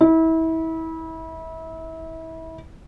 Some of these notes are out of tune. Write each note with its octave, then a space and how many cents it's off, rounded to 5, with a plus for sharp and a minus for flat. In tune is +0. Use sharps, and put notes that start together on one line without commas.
E4 -30